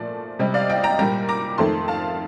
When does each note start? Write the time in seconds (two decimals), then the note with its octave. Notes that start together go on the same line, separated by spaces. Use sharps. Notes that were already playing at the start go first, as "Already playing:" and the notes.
Already playing: A#2 F3 A3 D5
0.39 C3 G3 D#5
0.54 D5 F5
0.69 D#5 G5
0.84 G5 A#5
0.99 A#2 G3 G5 A#5
1.29 A#5 D6
1.58 F2 D#3 A3 A5 C6
1.88 F5 A5